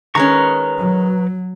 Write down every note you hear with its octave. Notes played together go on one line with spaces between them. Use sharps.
D#3 G#3 C#4 B4 A#5 C#6
F#3